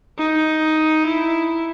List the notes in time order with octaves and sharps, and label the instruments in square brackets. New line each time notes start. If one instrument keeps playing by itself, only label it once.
[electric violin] D#4
E4